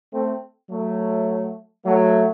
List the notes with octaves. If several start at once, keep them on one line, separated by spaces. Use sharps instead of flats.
A3 C4
F#3 A3
F#3 A3